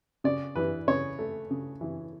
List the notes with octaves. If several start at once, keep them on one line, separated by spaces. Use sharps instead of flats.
C#3 D5
E3 B4
C#3 C#5
A3
C#3
E3